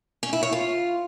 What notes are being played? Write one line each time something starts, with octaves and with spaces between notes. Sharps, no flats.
C#4
E4
C#5
F4